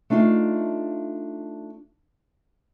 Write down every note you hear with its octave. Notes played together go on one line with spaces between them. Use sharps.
A3 D4 D#4 F4 F5